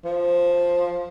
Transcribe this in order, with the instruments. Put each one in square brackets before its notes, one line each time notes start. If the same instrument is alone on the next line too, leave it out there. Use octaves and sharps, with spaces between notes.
[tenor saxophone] F3